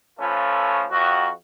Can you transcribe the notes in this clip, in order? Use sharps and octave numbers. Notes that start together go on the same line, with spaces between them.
F3 A3 C#4 F4 A4 B4
F2 F#4